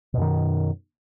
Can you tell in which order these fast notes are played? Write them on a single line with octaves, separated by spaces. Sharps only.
B2 F#2 D#3